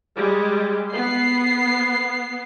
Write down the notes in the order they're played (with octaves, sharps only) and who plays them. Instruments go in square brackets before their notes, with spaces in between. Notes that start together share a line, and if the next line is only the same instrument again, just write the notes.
[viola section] G3 G#3
[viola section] B3 [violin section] C7